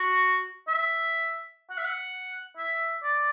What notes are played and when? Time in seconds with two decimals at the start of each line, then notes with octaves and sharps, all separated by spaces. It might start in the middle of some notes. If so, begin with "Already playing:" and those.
Already playing: F#4
0.68 E5
1.70 F#5
1.78 E5
1.84 F#5
2.57 E5
3.03 D5